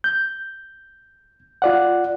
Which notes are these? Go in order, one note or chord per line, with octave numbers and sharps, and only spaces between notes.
G6
F4 D5 F#5